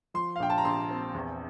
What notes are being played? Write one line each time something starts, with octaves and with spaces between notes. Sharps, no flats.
F3 C6
F5
A#1 G5
A5
A#5
A#1 C6
C4
E2